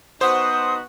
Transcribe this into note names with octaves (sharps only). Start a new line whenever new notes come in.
B3 D#4 F#4 C5 D#6